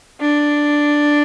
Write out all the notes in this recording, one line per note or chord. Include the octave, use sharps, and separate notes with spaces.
D4